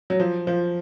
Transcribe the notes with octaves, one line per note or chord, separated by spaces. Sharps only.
F#3
F3
F3